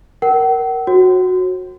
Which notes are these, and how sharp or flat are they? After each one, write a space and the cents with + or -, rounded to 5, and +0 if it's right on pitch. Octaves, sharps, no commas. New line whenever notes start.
A#4 +0 F#5 +45
F#4 -10 C#5 -45